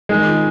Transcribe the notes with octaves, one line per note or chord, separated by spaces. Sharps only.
D#3 G#3
F4